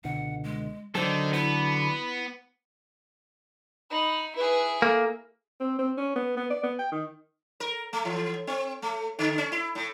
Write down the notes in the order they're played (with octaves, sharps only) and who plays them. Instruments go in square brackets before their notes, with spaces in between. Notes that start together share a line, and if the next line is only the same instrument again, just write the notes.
[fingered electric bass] C#2 B2 D3 [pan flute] F#5
[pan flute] G#3
[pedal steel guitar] D3 A4 [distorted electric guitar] D#3 [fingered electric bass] F#3 [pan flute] C5
[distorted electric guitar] B3 [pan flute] E4
[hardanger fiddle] D#4 [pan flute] B5
[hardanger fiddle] E4 G#4 [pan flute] B4
[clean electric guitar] A#3 [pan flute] A4
[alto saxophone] C4
C4
C#4
B3
B3
D5
B3
G5
D#3
[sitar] A#4
A3
E3
C4
A3
D3
C#4
E4
A2